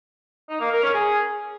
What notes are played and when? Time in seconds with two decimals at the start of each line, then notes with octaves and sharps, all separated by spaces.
0.49 D#4
0.60 A#3
0.72 A#4
0.83 C#4
0.94 G#4